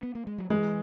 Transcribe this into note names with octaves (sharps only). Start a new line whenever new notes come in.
B3
A#3
G#3
F#3
E3 G#3